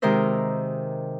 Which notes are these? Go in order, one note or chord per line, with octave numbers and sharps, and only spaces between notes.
C3 D#3 G#3 A#4 C5 E5